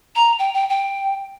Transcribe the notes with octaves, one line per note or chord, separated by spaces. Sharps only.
A#5
G5
G5
G5